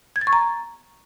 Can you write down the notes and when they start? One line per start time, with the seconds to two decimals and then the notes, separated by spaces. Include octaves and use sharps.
0.16 G#6
0.21 A6
0.27 C#6
0.33 A#5